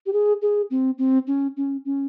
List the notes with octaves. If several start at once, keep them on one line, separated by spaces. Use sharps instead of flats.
G4
G#4
G#4
C4
C4
C#4
C#4
C#4